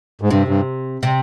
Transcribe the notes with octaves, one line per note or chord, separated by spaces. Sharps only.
G#2
G2 C3
G2
C3